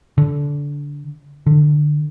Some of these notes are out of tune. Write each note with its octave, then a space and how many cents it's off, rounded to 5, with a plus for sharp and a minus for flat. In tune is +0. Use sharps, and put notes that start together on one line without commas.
D3 -20
D3 +20